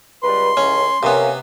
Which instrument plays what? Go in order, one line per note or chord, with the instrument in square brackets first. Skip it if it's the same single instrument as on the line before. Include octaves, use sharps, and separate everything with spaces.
[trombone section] C#2 G3 B4 [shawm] C6
[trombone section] C#2 A2 [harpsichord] C#4
[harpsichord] C3 B3 [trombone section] A#3 C#4